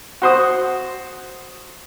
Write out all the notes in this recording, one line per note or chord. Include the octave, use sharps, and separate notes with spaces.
F#4 C5 D#6